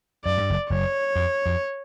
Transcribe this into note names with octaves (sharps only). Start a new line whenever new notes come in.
F#2 D5
G2
F#1 F#2
F#1 F#2 C#5
F2
F2